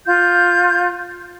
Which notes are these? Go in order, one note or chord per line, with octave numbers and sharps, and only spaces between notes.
F4 G6